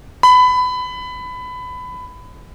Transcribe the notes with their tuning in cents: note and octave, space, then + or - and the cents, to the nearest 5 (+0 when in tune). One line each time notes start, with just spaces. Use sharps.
B5 +20